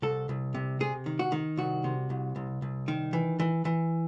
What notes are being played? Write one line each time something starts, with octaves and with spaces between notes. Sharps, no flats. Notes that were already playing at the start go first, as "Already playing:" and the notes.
C2 A4
C2
C3
C3 G#4
D#3
F#4
D#3
C2 F#4
C3
C2
C2
C2
D#3
E3
E3
E3